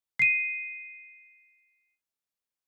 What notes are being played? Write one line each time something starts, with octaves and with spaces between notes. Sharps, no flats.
C7 D#7